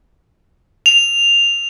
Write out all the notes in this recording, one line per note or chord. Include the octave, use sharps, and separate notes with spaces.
F7